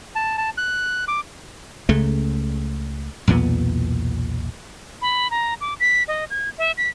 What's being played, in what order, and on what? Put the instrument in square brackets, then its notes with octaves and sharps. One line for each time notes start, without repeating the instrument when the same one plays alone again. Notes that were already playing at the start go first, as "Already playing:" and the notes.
[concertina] A5
A5
F#6
D6
[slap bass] C#2 C#3 A3
B1 E2 A#2 B3
[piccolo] B5
A#5
D6
B6
D#5
G#6
E5
B6